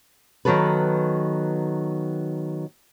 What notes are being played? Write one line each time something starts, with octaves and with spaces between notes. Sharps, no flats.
D#3 E3 F#3 B3 A4 B4